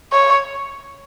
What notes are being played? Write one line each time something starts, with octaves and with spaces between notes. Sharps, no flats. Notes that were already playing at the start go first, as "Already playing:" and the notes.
C#5